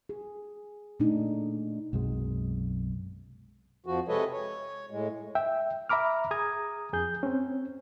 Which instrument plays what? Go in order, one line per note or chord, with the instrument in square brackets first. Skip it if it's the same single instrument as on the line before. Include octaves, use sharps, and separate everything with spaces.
[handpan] G#4
A#2 A3 D4 D#4
[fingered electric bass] B1 F#2 C3 G#3
[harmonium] F2 F3 F#4
C3 G#3 A4 B4 C#5 D#5
C#5
A2 G#3
[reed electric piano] E5 G5
E5 A#5 B5 D6 F6
G#4 A#5 D#6 G#6
F2 G#4 G6
C4 C#4